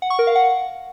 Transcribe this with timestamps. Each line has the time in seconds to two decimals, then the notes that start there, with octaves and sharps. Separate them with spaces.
0.02 F#5
0.10 C#6
0.19 A#4
0.27 F5
0.35 F#5